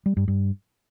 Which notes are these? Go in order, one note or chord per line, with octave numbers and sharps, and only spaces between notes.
G3
G2
G2